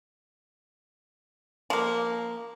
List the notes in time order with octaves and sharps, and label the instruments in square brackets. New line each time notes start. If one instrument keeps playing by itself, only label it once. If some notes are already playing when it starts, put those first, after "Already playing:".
[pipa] F3 A#3